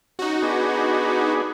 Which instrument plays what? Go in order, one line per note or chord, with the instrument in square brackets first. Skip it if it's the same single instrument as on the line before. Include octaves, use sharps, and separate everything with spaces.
[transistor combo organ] C#4 [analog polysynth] D#4 F#4
[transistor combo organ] B3 D4 G#4